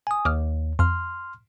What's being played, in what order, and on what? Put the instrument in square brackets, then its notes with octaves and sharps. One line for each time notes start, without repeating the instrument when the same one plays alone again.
[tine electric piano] G#5 D#6
[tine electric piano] D#2 [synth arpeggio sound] D6 D#6 F6
[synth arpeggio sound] F2 [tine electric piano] C6 F6